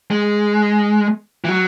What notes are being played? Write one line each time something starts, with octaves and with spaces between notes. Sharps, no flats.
G#3
E3
F#3